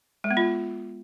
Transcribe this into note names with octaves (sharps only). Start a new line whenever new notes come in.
G#3
B3
F4